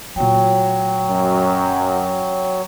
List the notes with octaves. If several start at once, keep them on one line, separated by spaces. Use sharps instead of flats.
A#2 F#3 A3 G5
F#2